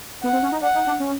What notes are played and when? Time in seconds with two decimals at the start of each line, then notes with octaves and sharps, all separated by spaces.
0.23 B3 F#5
0.33 C4
0.43 C#4
0.52 D#4
0.62 D4 F#5
0.75 D#4
0.87 D4
1.00 C#4